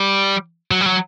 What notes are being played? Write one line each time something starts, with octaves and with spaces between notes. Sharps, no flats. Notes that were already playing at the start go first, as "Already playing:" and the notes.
Already playing: G3
F#3
G3
F#3